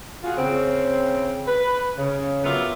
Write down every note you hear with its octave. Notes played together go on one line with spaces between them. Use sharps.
F4 F#4 G#4
C#3 C4
B4
C#3
F#3 B3 F4 G4 A#4 E5